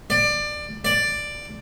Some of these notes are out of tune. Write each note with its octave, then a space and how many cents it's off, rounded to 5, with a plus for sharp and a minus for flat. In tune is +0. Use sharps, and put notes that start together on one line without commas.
D5 +20
D5 +5